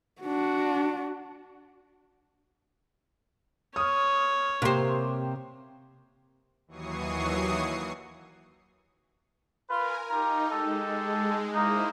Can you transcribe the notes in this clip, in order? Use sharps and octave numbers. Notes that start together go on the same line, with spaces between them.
D4 F#4
C#5 D#6 F6
C3 A#3 G4 C5
D#2 E3 F#3 C#6 D#6 C7
F4 A#4 B4 G#5
D#4 F4 G4 A#5
G#3 G4 A4
A#3 D#4 E4 C5